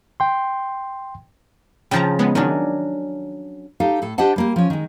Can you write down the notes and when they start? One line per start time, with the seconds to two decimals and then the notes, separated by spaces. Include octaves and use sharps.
0.20 G5 C6
1.91 C#3 F3 G5 A5 A#5
2.19 G#3 B3
2.35 D#3 F#3 C#4 D4
3.80 D#4 G4 A4 F5
4.02 A2 A4
4.18 D4 G4 C5 D#5 F#5 A5
4.36 G3 A#3 G4
4.56 F3 C#4
4.70 D#3 G#3